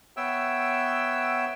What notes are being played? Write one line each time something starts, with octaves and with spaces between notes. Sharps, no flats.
B3 C#5 E5 G5 E6